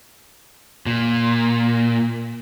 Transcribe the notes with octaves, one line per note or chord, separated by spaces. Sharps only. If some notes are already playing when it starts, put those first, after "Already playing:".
A#2